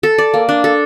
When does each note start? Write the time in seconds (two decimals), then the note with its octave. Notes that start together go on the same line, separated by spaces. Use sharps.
0.03 A4
0.18 D5
0.34 A#3
0.49 D4
0.64 A4